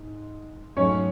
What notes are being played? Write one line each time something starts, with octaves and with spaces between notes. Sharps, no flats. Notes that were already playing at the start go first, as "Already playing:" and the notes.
Already playing: G#2
G#2 F#3 A3 C#4 C#5